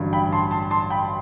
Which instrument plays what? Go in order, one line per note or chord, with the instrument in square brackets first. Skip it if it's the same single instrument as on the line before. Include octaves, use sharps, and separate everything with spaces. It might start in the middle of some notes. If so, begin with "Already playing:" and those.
Already playing: [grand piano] A1 G2 D3 F#3
[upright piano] G5 B5
A5 C6
A5 C6
A5 C6
G5 B5